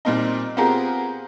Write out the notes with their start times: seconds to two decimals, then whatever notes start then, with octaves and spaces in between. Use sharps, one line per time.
0.05 A#2 G3 A#3 C4 D#4
0.57 B3 C4 F4 G4 G#4 A#4